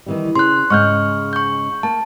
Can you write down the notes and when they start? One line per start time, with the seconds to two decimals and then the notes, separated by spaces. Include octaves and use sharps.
0.06 D#3 E3 G3
0.36 C#3 C6 F#6
0.70 G#2 C#3 C#6 F6 G6
1.33 C#6 G6
1.83 A#3 A5